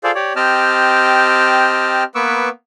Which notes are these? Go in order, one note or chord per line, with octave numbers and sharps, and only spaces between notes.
F4 G#4 A4 C5 D5 F5
G4 C#5 D5
C4 G4 D#5 G5 A5 F6
A#3 B3 B4 C#6 D6 E6